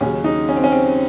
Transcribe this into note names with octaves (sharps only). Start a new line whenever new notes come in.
D#2 C#3 F#3 C#4
D#4
C#4
C4
C#4
C4